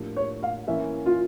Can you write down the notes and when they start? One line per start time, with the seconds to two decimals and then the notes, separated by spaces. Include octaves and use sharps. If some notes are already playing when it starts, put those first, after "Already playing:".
Already playing: A2 F3 A#3 D4 G4
0.16 C#5
0.43 F5
0.67 E3 A#3 C#4 E5
1.06 F4